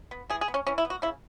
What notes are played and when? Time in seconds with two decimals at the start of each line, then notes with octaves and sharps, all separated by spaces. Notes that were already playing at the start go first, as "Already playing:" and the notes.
0.11 B3
0.30 E3 G#4
0.41 G#4
0.48 B3
0.54 C#4
0.67 E3 C#4
0.78 E4
0.85 B3
0.90 F#4
1.02 C#3 E4